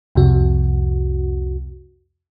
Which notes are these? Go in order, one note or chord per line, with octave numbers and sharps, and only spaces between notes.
C2 F2 C3 F#4